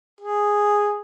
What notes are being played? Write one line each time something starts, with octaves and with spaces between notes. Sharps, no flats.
G#4